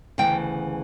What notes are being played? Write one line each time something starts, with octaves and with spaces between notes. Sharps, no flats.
D2 C#3 E3 B3 G5